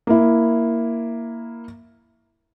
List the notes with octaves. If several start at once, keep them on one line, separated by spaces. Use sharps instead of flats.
A#3 E4